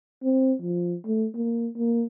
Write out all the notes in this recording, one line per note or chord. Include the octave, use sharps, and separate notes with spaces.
C4
F3
A3
A#3
A#3